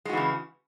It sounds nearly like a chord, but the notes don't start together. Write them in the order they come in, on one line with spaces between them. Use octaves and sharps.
G#3 F#4 E3 C#3